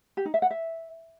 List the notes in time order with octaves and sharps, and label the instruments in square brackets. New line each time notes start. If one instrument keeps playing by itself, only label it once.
[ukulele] G4
D#4
E5
F#5
E5